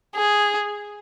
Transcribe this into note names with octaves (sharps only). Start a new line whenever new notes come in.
G#4